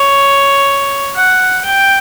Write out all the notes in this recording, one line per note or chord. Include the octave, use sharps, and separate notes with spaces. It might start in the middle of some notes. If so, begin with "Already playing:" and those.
Already playing: C#5
F#5
G5